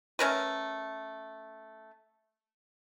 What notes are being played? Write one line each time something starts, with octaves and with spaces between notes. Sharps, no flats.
A3 C#4 A#4 B4